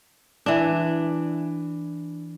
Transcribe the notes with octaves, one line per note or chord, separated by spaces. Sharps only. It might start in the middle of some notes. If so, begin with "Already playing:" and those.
E3 D4